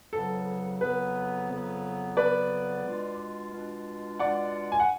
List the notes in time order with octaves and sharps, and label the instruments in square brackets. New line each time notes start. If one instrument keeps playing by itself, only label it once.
[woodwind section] F2 C#3 F#3 B3 [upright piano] A4
[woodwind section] F2 C#3 F#3 B3 [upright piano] B4
[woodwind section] F2 C#3 F#3 B3
[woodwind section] F2 C#3 F#3 B3 [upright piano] B4 D5
[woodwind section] B2 G#3 D4 F4
B2 G#3 D4 F4
[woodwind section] B2 G#3 D4 F4 [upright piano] D5 F#5
[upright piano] G#5
F#5